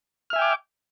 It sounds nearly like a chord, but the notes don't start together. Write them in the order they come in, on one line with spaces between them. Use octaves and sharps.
F6 E5 G#5 G5 D6